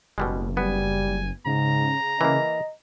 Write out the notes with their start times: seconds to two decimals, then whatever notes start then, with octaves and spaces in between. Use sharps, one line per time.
0.18 F#1 B2 G3 G#3
0.57 G3 B3 G#5
1.46 G#2 C#3 A#5
2.21 E3 A#3 D#5